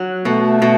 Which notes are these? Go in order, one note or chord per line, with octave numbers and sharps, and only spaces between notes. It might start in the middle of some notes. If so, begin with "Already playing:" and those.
Already playing: F#3
B2 A3
B2